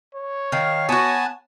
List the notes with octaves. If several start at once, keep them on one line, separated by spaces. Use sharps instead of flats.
C#5
D#3 F5
B3 F#4 G#5 A5